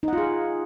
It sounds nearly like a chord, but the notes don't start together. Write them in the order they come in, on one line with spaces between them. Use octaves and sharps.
D#4 F#5 F4 G#4